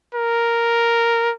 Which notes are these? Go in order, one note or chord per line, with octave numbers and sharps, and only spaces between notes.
A#4